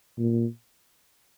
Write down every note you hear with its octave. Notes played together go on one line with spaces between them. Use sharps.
A#2